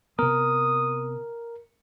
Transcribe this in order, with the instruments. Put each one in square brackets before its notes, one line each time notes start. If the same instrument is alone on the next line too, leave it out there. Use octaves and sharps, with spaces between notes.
[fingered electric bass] C3 B3 [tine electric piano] A#4 [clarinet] D#6